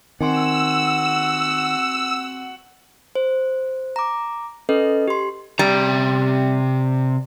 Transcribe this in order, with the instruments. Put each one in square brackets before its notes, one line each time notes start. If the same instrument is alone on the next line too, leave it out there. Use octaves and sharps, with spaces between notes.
[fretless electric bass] D#3 [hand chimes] C4 G#5 C6 [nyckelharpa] F#4 F#5 [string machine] E6
[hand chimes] C5
A#5 D6
C#4 A4 B4 D#5
G4 C6
[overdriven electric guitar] C3 A#5 [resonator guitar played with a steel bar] G3